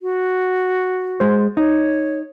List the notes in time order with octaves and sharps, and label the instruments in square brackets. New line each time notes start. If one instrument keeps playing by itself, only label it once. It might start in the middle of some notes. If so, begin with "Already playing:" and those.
[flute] F#4
[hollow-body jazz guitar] G#3 C5
[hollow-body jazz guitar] D#4 [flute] C#5